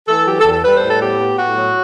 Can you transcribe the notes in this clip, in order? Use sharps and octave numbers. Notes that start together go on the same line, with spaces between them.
E3 A4
F#3 G4
A4
E2
A4
G3 B4
C5
A2
A4
B3 G4
B3
A2 F#4
F#3